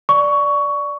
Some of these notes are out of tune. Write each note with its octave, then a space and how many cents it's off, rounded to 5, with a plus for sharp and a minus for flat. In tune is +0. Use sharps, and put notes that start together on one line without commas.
D5 +0 C#6 +15